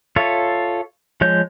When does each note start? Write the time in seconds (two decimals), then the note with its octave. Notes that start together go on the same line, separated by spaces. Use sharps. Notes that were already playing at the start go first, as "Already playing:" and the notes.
0.16 F4 A4 C#5 E5
1.21 F3 G#3 C#5 G6